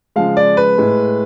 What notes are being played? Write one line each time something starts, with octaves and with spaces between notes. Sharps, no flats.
C#3 F3 G#3 F5
D5
B4
A2 G#3